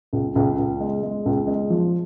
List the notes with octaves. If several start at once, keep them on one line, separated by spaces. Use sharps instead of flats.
C#2
C#2
C#2
G#3
G#3
C#2
G#3
F3